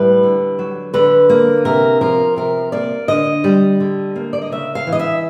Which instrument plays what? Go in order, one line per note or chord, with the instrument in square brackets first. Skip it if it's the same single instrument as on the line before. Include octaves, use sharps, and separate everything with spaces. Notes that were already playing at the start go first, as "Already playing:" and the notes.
Already playing: [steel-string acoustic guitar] A2 G3 B4
D3
F#3
D3 B4
A#3
C3 A#4
F3 A#4
C3 A#4
A#3 D5
D3 D#5
G3
D3
A#3
D5
D#5
C#3 E5
F5
E3
D#5
E5